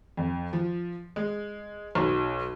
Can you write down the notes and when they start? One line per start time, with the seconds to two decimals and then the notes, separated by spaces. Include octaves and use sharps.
0.17 F2
0.53 F3
1.16 G#3
1.95 B1